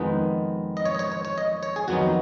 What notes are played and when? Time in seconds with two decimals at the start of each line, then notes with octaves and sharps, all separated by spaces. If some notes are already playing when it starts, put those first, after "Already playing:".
Already playing: F2 D#3 G#3 B3 D#4 B4
0.77 D#5
0.85 C#5
0.95 D#5
0.99 C#5
1.12 C#5
1.25 C#5
1.38 D#5
1.63 C#5
1.76 G#4
1.88 F2 D#3 F#3 B3 D#4 F#4